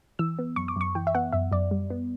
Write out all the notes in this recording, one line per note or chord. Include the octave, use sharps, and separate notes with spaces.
E3 E6
B3
F#2 C#6
D6
F#2 C#6
E3 G5
E5
B3 F#5
F#2 E5
F#2 D5
G3
B3